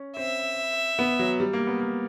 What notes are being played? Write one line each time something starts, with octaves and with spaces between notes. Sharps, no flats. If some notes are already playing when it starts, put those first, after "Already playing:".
Already playing: C#4
C4 E5
B3
F#3
G3
A#3
B3
A#3